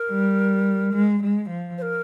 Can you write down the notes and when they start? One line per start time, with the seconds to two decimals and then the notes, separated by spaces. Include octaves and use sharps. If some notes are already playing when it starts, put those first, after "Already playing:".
Already playing: A#4
0.10 G3
0.94 G#3
1.23 G#3
1.49 F3
1.78 C5
1.82 A#4